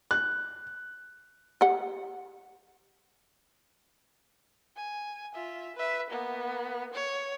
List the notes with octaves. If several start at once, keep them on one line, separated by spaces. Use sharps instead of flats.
F#6
G4 F#5
G#5
F4 E5
B4 E5
A#3 B3
C#5